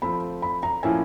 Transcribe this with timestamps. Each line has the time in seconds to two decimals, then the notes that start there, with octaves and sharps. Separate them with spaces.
0.02 F3 A3 C4 B5
0.42 B5
0.63 A#5
0.83 A2 F3 A#3 C#4 E4 G#5